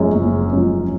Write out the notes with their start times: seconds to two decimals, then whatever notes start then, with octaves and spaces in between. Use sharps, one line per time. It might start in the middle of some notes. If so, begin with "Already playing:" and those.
Already playing: F#1 F#2 F3 G#3 C#4
0.15 F#1
0.53 F#2 F3 G#3 C#4